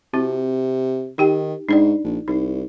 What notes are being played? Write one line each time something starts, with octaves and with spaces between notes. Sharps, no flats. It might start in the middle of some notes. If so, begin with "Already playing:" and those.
C3 C4 E4 F#4
D#3 D#4 G4 G5
G#2 D4 D#4 D5
A#1
C2 D#4